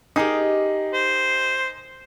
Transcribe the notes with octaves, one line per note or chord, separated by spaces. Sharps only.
D#4 G4 G#4 A#4 D#5
C5